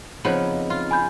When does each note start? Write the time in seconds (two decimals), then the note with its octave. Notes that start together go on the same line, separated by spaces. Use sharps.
0.25 C#3 F3 B3 C4 D#4 B4
0.70 F4
0.91 G#5 B5 G6